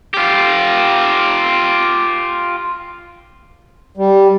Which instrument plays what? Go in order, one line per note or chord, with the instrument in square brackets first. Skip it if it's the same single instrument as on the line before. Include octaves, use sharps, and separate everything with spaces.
[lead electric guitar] F4 G4
[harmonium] G3